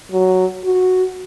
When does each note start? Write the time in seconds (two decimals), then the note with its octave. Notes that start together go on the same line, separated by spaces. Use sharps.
0.12 F#3
0.65 F#4